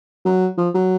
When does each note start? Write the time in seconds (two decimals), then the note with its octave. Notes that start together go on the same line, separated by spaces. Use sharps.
0.25 F#3
0.58 F3
0.74 F#3